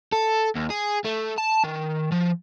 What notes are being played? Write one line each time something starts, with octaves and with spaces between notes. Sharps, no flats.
A4
D#2
G#4
A3
A5
D#3
F3